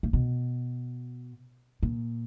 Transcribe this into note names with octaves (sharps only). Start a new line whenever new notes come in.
A#2
B2
A#2